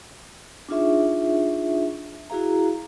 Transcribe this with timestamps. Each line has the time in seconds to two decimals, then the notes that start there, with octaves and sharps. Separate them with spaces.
0.69 D4 D#4 F4 G#4 E5 C#6
2.30 E4 F#4 G#4 F5 A#5